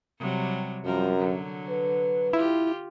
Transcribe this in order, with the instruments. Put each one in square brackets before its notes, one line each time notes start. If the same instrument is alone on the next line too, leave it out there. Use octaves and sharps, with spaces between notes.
[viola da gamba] C3 F#3 G3
[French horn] F#2 [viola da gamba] F3 G3 A#4
[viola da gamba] D3 F#3
[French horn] B4
[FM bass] E4 [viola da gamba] F4 G4